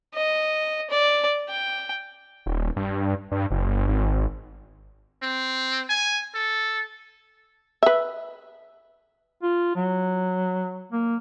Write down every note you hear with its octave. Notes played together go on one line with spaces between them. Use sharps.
D#5
D5
G5
D#1
G2
G2
F#1
G1
G#1
C4
G#5
A4
B4 E5
F4
F#3
A#3